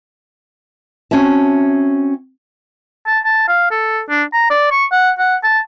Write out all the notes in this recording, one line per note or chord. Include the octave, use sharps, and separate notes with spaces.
C4 C#4 F#4 E5 A5
A5
A5
F5
A4
D4
A#5
D5
C#6
F#5
F#5
A5